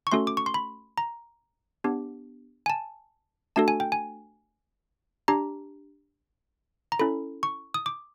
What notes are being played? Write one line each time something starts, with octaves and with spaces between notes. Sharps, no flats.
C#6
A3 C#4 F#4 A4 C6
D6
C#6
C6
B5
A#5
B3 D4 G4
G#5
A5
A3 D4 F#4 A4 A5
G#5
G5
G#5
D4 G4 A#5
A#5
C#4 E4 A4 B5
C#6
D#6
D6